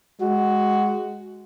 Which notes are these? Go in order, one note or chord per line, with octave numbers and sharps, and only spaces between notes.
G#3 F#4